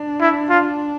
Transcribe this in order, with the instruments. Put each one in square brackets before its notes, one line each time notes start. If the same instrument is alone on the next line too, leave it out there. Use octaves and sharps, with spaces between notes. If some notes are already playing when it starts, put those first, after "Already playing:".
Already playing: [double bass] D4
[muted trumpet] E4
F4